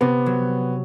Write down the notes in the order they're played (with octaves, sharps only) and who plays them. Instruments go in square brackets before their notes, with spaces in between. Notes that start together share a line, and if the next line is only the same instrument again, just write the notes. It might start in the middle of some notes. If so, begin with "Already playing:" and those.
[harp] C3 [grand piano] B3
[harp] F#3